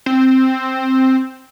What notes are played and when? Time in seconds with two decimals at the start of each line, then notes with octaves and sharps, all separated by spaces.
0.06 C4